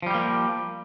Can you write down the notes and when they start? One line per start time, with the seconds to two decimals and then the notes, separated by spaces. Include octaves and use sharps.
0.03 F3
0.06 G3
0.10 G4
0.14 A#3